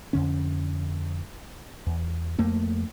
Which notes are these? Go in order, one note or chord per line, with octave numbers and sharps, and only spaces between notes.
F2 D3 C#4
E2
F2 A3 A#3